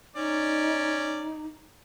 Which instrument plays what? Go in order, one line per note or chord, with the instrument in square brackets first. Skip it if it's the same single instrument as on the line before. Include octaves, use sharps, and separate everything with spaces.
[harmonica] C#4 D5 [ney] D#4